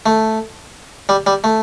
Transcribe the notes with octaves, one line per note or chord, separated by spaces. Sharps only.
A3
G3
G3
A3